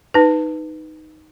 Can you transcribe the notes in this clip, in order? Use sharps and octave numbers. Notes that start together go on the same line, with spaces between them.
D#4 B4